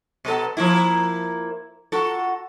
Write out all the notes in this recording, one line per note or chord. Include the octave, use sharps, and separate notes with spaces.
B2 B3 A4
F3 A#3 E4
F4 F#4 A4